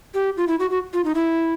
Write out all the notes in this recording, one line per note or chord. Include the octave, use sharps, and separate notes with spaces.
G4
F4
E4
F#4
F#4
F4
D#4
E4